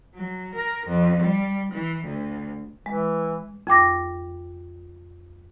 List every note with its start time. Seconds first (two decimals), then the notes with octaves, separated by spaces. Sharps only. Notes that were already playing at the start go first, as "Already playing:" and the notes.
0.15 F#3
0.56 A#4
0.87 F2
1.23 G3
1.73 E3
2.05 D2
2.86 E3 G#3
3.67 F2 G5 D6 A#6